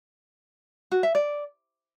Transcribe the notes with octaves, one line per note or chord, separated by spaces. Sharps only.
F#4
E5
D5